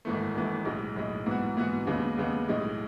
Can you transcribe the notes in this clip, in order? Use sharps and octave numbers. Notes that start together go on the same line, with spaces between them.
G#1 G#2 E3 A3
G#1 G#2 E3 A3
B1 A2 G#3 D#4
B1 A2 G#3 D#4
G#2 E3 B3 F#4
G#2 E3 B3 F#4
D#2 C#3 G#3 B3
D#2 C#3 G#3 B3
B1 A2 G#3 D#4